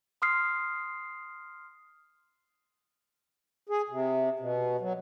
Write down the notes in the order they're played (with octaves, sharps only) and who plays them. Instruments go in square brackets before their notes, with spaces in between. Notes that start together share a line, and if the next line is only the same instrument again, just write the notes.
[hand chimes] C6 D#6 F6 C7
[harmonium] G#4
C3
B2
F#3